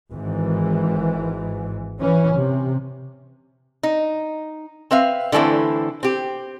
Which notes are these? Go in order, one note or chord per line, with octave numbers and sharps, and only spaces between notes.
G#1 G#2 E3
E3 C#4
C3
D#4
C4 B4 E5 F5
D3 E3 A3 C4 E4
C4 G4